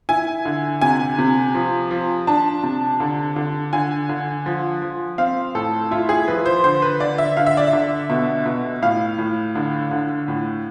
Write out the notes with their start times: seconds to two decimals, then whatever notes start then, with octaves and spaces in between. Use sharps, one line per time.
0.09 E4 G#5
0.45 D3
0.81 C3 G#5
1.18 C3
1.55 F3
1.91 F3
2.27 D4 A5
2.63 C3
3.00 D3
3.36 D3
3.73 D3 G#5
4.09 D3
4.46 F3
4.82 F3
5.18 C4 F5
5.55 A2 A4
5.91 E4 F4
6.09 G#4
6.28 F3 B4
6.46 C5
6.64 D3 C5
6.82 B4
7.00 D3 D5
7.18 E5
7.37 D3 F5
7.46 E5
7.57 D5
7.67 E5
7.73 D3
8.10 B2
8.46 B2
8.82 A2 F5
9.18 A2
9.55 D3
9.91 D3
10.28 A2